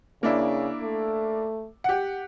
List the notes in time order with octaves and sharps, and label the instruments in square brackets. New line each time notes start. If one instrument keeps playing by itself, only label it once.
[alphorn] C#3 [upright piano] A#3 D4 E4
[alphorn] A3
[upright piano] G4 F#5